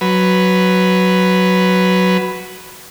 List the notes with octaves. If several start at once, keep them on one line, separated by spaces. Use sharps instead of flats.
F#3 B4